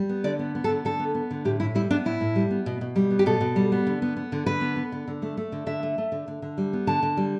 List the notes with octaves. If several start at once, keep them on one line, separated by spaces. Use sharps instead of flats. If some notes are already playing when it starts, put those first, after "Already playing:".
Already playing: G3
B3
D3 D5
B3
B3
A4
D3
D3 A4
B3
B3
D3
A2 G4
A2 E4
G3 E4
B3 D4
A2 E4
A2
G3
B3
B2
B2
G3
B3
G4
B2 A4
B2
G3
B3
D3
B3
B3
D3
D3 B4
B3
B3
D3
D3
A3
A3
D3
D3 E5
A3
A3
D3
D3
D3
G3
B3
D3 A5
D3
G3